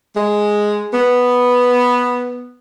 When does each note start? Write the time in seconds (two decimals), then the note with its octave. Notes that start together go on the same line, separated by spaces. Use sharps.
0.17 G#3
0.94 B3